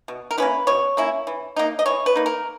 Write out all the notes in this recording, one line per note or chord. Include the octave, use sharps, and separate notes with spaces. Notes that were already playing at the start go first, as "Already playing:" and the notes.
B2
A#4
A#3 C#4 E4 B4
B2 C#5
A#3 C#4 E4
E3
A#3 D#4
D#5
E3 C#5
B4
A#3 D#4
A#4